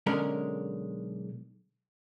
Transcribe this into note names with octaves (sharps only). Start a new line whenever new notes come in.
B1 D3 G#3 C#4 A#4